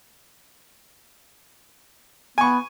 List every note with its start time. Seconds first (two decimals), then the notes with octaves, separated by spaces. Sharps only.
2.38 B3 G#5 C#6